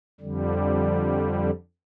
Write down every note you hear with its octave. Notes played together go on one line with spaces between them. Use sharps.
F2 D3 G3